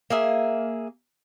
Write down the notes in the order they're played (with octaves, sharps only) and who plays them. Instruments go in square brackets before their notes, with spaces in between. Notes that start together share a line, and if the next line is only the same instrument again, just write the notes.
[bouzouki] A#3 G#4 E5